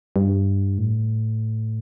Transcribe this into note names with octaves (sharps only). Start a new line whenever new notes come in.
G2
A2